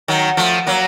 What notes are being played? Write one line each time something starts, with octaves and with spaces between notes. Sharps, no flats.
D#3 F#3
F3 A3
F#3 A#3